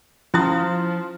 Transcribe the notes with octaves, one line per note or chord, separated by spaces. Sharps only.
F3 C#4 E4 D#6